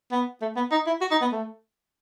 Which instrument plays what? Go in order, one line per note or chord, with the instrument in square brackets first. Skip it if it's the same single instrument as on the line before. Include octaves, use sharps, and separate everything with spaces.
[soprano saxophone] B3
A3
B3
D#4
E4
F#4
D#4
B3
A3